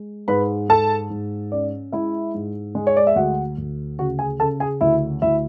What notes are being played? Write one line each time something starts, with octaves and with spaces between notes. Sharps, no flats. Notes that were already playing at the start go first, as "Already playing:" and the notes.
Already playing: G#3
G#2 B4 B5
G#2 A4 A5
G#2
C#4 D5
G#3 E4 E5
G#2
G#3
C#5
D5
E5
D2 F#4 F#5
D2
C#3 F#4 F#5
G#4 G#5
C#3 A4 A5
G#4 G#5
D2 E4 E5
D2 E4 E5